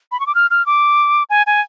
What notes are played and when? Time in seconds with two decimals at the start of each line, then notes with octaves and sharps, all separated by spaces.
0.12 B5
0.20 C#6
0.27 D6
0.35 F6
0.51 F6
0.66 D6
1.30 G#5
1.47 G#5